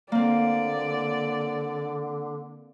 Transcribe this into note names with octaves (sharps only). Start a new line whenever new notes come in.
D3 A#3 C4 D5